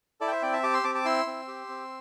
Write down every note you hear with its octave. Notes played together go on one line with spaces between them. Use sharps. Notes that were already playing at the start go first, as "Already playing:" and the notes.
E4 A4 D5
G5
C5 E5
C4 D5 G5
E5 A5
G4 A5 D6
C6 E6
C4 A5 D6
A5 D6
E4 C6 E6
C4
G4
C4